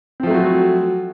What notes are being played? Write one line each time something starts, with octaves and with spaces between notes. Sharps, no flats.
F3 F#3 A3 C4 F#4